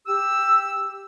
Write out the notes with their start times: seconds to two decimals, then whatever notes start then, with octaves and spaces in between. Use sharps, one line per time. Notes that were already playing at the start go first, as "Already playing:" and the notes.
0.06 G4 E6